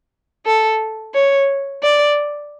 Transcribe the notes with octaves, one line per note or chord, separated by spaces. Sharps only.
A4
C#5
D5